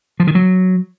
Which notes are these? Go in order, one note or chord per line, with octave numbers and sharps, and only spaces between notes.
F3
D#3
F#3